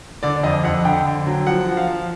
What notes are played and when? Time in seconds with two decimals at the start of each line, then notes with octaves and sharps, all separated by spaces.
0.23 D3 D5
0.36 D5
0.43 F2 D#5
0.64 F2 F#5
0.85 D3 G5
1.06 D3
1.27 F#3
1.47 F3 F#5
1.67 F3
1.77 F5
1.87 F3